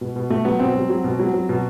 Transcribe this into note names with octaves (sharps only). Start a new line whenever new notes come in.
B2
B2
B2 A3
F#3 B3
B2 C4
F#3
F#3
B2
F#3
F#3
B2